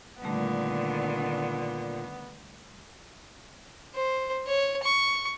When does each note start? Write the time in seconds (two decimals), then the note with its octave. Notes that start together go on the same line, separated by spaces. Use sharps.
0.22 A#2 D3 D#3 G3 A3 B3
3.95 C5
4.47 C#5
4.84 C#6